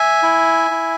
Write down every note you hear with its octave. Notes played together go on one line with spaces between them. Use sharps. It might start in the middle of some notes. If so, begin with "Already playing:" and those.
Already playing: E5 G#5
E4
E4